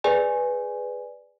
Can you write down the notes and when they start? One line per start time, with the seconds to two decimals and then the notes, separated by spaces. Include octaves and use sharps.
0.04 G#4 B4 D5 G#5